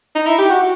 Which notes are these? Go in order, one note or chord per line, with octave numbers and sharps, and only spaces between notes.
D#4
E4
G4
F#4